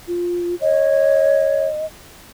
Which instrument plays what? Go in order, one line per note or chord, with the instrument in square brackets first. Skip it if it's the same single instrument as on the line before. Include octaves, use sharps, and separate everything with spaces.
[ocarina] F4
[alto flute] C#5 [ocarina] D#5